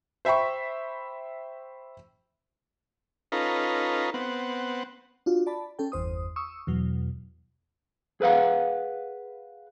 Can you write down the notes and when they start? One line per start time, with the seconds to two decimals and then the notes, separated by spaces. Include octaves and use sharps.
0.25 C5 E5 G5 B5 C#6
3.32 C#4 D#4 F4 A4 B4 A#5
4.14 B3 C4 F#5
5.26 D4 F4 F#4
5.46 D5 A5 B5
5.79 C#4 A4 G5
5.92 G1 E2 C5 D#6
6.36 C#6 D#6 E6
6.67 E2 B2 F#3
8.21 G#4 B4 F5 F#5